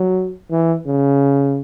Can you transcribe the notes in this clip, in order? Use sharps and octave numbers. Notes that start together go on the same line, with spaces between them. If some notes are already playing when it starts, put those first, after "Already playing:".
Already playing: F#3
E3
C#3